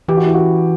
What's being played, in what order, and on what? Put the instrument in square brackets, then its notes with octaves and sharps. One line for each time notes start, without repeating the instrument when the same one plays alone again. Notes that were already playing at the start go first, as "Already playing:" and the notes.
[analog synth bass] E3 [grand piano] G4
[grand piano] F#4
E4
F#4